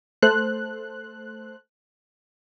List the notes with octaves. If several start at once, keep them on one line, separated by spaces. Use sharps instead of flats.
A3 A4 C5 F#6